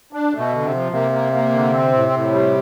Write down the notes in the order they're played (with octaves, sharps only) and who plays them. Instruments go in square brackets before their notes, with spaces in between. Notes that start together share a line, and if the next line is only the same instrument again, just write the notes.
[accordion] D4
A3
[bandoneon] B2
[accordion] D3
[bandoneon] C3
[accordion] F3
[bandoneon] C3 [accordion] A#3
[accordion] A#3
A#3
D3
C4
A2
A2
G3